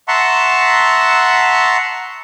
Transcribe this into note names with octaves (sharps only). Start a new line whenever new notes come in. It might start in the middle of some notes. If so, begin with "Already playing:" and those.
E5 F#5 A5 A#5 C6 C#6